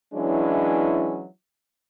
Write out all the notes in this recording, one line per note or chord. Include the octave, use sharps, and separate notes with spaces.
E3 F#3 G#3 C#4 D4 E4